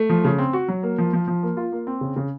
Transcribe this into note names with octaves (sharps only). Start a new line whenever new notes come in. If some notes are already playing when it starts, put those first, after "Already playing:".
Already playing: A3
F3
C#3
C4
F#4
F#3
A#3
F3
F3
F3
A#3
F4
A#3
C4
C#3
C#3